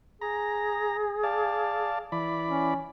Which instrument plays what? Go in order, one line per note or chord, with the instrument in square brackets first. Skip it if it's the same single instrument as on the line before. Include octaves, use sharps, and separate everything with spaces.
[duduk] G#4 [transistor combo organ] A#5
[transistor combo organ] D5 F5 A5
E3 D5 B5
[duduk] C#4